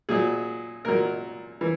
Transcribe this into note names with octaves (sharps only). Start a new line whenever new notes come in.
A#2 F#3 G#4
A#2 F#3 A#4
E3